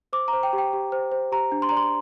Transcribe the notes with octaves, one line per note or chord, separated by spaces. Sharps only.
C5 D6
A#5
C5
G5
G4
G5
G4
C5
C5
G4 A#5
D4
C6
D5 A#5
C6